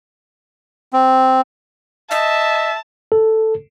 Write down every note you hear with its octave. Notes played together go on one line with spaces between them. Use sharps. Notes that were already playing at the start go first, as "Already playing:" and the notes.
C4
D#5 E5 A5
A4